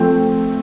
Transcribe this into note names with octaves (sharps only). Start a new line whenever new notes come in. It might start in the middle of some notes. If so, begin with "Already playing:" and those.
Already playing: F3 A3 C4